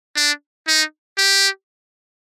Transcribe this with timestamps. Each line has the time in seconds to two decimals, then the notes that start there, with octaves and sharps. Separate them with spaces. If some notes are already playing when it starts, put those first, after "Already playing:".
0.16 D4
0.67 D#4
1.17 G4